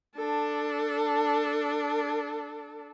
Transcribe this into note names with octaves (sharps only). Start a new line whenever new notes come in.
D4 A4